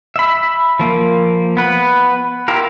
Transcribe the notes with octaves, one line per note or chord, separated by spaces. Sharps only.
E5 B5
F3 A#3
B3 B4
E4 F4 G4 A#4